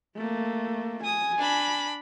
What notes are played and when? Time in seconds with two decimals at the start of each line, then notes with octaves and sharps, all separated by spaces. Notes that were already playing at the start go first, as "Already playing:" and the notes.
0.17 A3 A#3
1.04 G#5 D#6
1.38 D4 B5